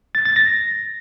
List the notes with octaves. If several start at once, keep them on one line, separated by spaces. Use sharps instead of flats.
A6
A6
A#6